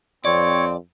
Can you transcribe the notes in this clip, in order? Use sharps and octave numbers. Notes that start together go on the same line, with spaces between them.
F2 C4 C#5 D5